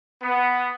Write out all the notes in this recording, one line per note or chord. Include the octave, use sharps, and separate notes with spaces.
B3